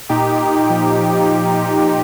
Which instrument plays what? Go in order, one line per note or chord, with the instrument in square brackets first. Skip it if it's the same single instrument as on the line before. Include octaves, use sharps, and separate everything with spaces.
[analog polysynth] A#2 D#4 G4
A#2
F3
F3
A#2
A#2